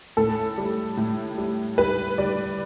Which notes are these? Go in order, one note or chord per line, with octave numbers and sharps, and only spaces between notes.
A2 A4
G3
A2
G3
G3 B4
G3 D5